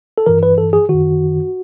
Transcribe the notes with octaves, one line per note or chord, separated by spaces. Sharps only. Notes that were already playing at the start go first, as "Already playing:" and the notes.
A4
G2 E3 A#4
B4
A4
G#4
F#2 D#3 F#4